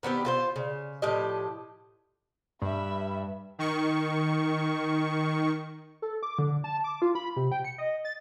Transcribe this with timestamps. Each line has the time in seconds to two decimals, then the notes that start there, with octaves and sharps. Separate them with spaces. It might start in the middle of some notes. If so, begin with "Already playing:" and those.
0.03 D#3 B3 C4 G4
0.25 F4 A4 C5
0.56 C#3
1.02 A2 F3 G4 D#5
2.62 G2 E5 B5
3.59 D#3 C#6
6.02 A4
6.23 D6
6.39 D3
6.64 A5
6.84 D6
7.02 F4
7.15 B5
7.36 C3
7.52 G5
7.64 C#7
7.78 D#5
8.05 A6